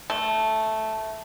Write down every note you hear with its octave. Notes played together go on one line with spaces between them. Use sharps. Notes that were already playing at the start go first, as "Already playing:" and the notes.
A3